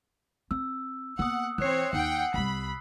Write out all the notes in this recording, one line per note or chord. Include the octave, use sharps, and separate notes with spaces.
C4 E6
A#3 B3 F#5 D#6 E6
E3 C4 C#5 F#6 C7
D#2 D#4 F#5 G5
C2 G3 B5